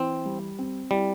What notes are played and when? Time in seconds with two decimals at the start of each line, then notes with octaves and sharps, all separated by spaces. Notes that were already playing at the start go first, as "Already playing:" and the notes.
Already playing: E3 C4 E4
0.25 G3
0.59 C4
0.91 G3 E4